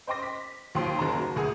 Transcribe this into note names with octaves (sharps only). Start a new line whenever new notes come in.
C5 D#5 G5 C6 D6 A#6
B6
D#2 F3 F#3 G5 C6 D#6
F#1 D#2 A5 A#5
F#4
D2 G#4 F#5 D#6